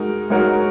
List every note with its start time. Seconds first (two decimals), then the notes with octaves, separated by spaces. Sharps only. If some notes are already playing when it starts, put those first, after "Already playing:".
Already playing: G#3 D#4 F#4 A#4
0.30 G#3 D#4 F#4 A#4 C#5